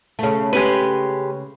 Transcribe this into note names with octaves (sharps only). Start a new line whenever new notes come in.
C#3 A3
G#3 G4 B4